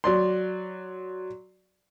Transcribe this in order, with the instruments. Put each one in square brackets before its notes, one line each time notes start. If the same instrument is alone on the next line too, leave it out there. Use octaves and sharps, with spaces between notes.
[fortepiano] F#3 D5 C6